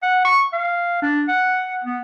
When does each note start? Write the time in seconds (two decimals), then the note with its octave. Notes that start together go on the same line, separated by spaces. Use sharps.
0.02 F#5
0.25 C#6
0.53 F5
1.02 D4
1.28 F#5
1.84 B3